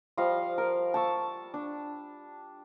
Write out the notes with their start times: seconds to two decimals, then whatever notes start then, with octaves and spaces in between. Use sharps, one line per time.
0.17 F3 G3 D#5 F5
0.58 A#4
0.94 A5 C#6 E6
1.54 D4